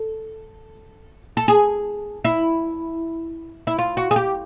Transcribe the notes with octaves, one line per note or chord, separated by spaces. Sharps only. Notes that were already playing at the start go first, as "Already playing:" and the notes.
Already playing: A4
A4
G#4
E4
E4
F4
F#4
G#4
G4